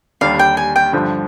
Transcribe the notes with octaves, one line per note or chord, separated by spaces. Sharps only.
D#2 D3 G3 D4 F5
G5
G#5
G5
G2 D3 F3